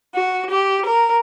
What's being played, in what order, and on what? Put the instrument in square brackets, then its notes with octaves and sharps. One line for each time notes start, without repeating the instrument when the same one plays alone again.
[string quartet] F#4
G4
A#4